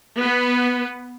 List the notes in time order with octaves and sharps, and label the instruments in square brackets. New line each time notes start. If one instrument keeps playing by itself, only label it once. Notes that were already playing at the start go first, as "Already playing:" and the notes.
[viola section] B3 B4